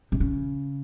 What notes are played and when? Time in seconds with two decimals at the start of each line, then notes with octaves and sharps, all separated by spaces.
0.12 C3
0.20 C#3